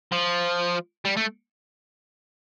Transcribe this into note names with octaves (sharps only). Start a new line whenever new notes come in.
F3
G3
A3